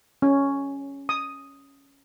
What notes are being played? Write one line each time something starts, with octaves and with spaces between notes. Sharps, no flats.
C#4
D#6